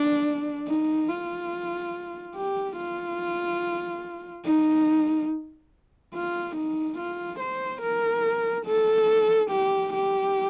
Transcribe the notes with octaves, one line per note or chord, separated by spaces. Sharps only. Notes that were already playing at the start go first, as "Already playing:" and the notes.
Already playing: D4
D#4
F4
G4
F4
D#4
F4
D#4
F4
C5
A#4
A4
G4
G4